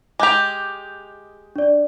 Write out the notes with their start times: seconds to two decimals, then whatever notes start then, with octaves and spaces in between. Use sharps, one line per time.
0.19 G#3 G4 D6 G6 F7
1.56 D4 D5